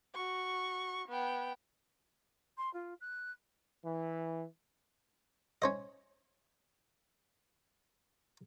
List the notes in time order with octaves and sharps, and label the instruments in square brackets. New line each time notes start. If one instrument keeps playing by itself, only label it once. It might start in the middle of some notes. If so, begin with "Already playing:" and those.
[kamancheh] F#4 C#6
B3 G5
[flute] C6
F4
F#6
[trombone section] E3
[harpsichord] C#4 C5 D#5